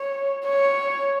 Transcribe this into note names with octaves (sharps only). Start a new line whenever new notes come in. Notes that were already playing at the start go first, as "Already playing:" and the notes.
Already playing: C#5
C#5